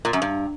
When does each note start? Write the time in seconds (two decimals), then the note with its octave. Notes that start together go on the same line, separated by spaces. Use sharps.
0.05 A#2
0.13 F#2
0.22 G2